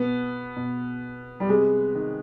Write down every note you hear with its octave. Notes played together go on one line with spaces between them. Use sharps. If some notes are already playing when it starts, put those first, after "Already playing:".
Already playing: B2 B3
B2
G3
C3 G#3
D#3